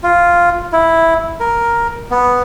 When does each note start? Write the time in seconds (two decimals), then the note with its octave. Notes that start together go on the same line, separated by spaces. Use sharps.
0.03 F4
0.73 E4
1.40 A#4
2.11 B3